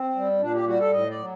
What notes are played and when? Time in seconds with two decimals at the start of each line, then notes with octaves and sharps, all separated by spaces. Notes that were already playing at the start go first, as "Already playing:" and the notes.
Already playing: C4
0.15 G3
0.41 A#2 D4
0.54 G4
0.67 G3 F#4
0.80 A4
0.93 A2 D#5
1.10 D5
1.19 F#3